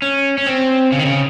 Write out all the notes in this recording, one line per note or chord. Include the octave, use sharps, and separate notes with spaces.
C#4
C#4
C4
C#3
D#3
C#3